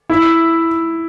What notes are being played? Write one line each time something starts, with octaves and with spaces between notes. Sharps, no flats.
E4